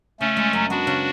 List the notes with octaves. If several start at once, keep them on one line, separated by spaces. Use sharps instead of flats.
C#3 A3 C#4
G#3
F#2
B3 D4 F#4
C#3